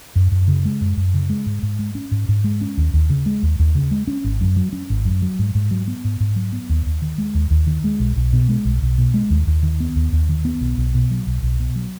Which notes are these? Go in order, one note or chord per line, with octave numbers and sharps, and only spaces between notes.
F#2
F#2
C#3
G#3
F#2
F#2
C#3
G#3
G#2
G#2
G#3
C#4
G#2
G#2
G#3
C#4
D#2
D#2
C#3
G#3
D#2
D#2
C#3
G#3
C#4
G#1
F#2
F#3
C#4
G#1
F#2
F#3
G#2
G#2
F#3
B3
G#2
G#2
F#3
B3
D#2
D#2
D#3
G#3
D#2
D#2
D#3
G#3
B1
B1
B2
G#3
B1
B1
B2
G#3
D#2
D#2
D#3
B3
D#2
D#2
D#3
B3
B1
B1
B2
F#3
B1
B1
B2
F#3